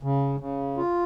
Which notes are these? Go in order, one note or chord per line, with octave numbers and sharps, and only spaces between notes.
C#3
C#3
F4